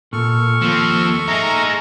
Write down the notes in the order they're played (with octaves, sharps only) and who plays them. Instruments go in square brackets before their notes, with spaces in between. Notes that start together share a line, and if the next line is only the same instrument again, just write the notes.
[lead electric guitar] A#2 [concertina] A4 C#6 F6
[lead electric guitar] D#2 A#3 [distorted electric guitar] F3 C4
[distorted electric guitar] G#3 D#4 [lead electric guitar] E5 [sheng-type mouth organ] A#5